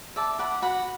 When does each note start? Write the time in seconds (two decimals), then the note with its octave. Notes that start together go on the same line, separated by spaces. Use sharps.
0.16 D5 E5 A5
0.39 D5 F#5 B5
0.62 F#4 F#5 B5